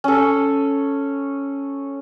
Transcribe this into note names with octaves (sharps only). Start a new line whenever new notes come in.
C#4 A4